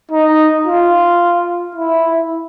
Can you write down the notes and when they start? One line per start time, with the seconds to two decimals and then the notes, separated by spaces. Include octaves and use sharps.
0.11 D#4
0.66 F4
1.75 E4